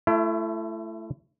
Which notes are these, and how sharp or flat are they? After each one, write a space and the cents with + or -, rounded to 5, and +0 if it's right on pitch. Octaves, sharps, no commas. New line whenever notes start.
A3 +0 E4 +35